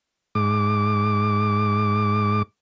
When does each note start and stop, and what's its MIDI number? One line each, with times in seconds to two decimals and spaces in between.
0.35 2.42 44
0.35 2.42 86